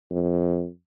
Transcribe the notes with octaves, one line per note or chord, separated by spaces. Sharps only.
F2